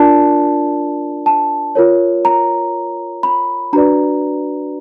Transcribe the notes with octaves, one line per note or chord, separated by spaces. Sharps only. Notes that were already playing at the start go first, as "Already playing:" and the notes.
Already playing: D4 F4 A#4 D5 A5
A5
F4 A#4 C#5
A#5
B5
D4 F#4 B4 D5 A#5